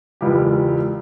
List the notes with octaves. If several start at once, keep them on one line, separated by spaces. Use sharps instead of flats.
E1 C#2 G4